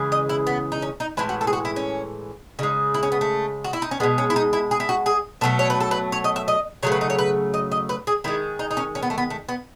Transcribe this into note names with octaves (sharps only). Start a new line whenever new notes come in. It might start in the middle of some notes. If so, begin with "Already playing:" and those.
Already playing: C#3 E3 G#3
D#5
E4
B3
D#4
C#4
D#4
A2 E3 G#3 E4
F#4
A4
G#4
F#4
E4
C#4
C#3 G#3 D#4
E4
C#4
B3
A3
F#4
E4
D#4
C#4
B2 G#3 B3
C#4
E4
D#4
E4
G#4
E4
F#4
G#4
B2 F#3 A3 A4
C#5
B4
A4
B4
C#5
D#5
E5
D#5
C#3 F#3 A3 C#5
B4
D#4
C#5
B4
D#5
D#5
B4
G#4
D#3 G#3 E4
D#4
D#4
C#4
C#4
B3
A3
B3
A3
B3